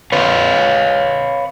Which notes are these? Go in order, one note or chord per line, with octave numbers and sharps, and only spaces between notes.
B4 C#5 F5